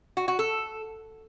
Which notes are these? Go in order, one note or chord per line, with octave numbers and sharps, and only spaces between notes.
F#4
F#4
A4